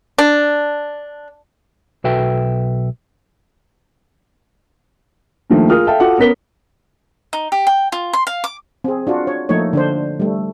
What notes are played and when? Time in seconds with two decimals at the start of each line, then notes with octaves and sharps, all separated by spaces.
0.18 D4
2.04 B1 F#4 A4 B4 E5 G5
5.50 G2 D#3 F3 A3 A#3
5.70 F4 G#4 A#4 D#6 F6
5.87 A4 E5 F5 G5 A5
6.00 F4 F#4 A4 F#5 D6
6.18 B3 C#4 A#4 B6 G7
7.33 D#4
7.52 G4
7.67 G5
7.92 F4
8.13 C6
8.27 F5
8.44 D6
8.84 C4 G#4
9.07 D4 F4 F#4
9.27 C#5
9.49 F3 A3 A#3 D#4 C#5
9.73 D3 D4 C5
10.20 G3 A3